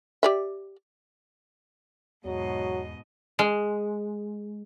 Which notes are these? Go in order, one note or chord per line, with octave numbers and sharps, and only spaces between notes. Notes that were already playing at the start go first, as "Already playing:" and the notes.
G4 D5 E5
E2 G#2 B2 F#3 D#5
G#3